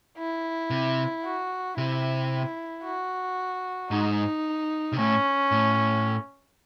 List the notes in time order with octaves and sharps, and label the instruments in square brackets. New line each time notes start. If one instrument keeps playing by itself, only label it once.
[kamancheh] E4
[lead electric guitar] C3
[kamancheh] F#4
[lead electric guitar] C3 [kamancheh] E4
[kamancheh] F#4
[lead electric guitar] G#2 [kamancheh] D#4
[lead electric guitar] C3
[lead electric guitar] A2 [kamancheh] C#4
[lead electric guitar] A2